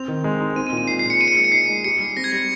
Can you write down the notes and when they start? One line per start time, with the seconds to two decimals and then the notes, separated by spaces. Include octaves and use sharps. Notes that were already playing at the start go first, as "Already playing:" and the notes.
Already playing: C4 F7
0.08 D#3
0.24 G#3
0.41 D#4
0.56 C4 D#7
0.67 D#7
0.72 A#2
0.77 D#7
0.88 G#3 C7
0.99 A#2 C7
1.10 C#7
1.20 G#4 D#7
1.28 C#7
1.37 G#3
1.44 C#7
1.52 D#4 C7
1.69 G#3
1.84 G4 C#7
2.00 G3
2.17 C4 A#6
2.24 G#6
2.32 G3 A#6